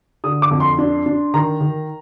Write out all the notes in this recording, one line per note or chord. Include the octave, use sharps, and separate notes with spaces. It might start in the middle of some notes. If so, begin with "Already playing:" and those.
D3 D#6
D6
F2
C6
D4
D4
D#3 A#5
D#3